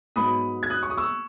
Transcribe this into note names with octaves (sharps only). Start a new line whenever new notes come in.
G#2 F#3 B3 B5 D#6
G#6
D#6 F#6
C#6
D#6
C#6 E6